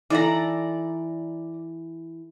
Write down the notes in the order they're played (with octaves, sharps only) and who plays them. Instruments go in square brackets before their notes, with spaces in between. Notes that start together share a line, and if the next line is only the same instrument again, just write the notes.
[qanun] E3 A4 [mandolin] D5 A#5